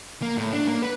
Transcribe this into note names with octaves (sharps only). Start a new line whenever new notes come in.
A#3
A2
D4
A#3
B4